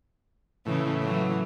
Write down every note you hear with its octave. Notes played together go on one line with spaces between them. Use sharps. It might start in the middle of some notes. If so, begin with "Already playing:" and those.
A2 C#3 E3
E3 F#3 A3